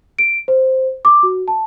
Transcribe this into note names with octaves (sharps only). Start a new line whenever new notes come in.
D7
C5
D6
F#4
A5